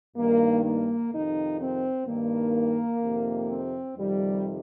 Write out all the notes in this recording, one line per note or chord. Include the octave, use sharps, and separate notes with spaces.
G2 D#3 A#3
A#3
F2 C3 D#3 D#4
C4
G2 D#3 A#3
F2 C3 D#3
C4
F2 C3 D#3 G3